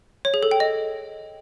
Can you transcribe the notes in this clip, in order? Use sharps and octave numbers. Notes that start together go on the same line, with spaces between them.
C#5
G#4
A4
G5
D#5